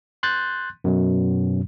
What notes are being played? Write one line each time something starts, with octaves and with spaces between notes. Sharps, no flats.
C6 F#6 G6 A6
F#2 B2 F#3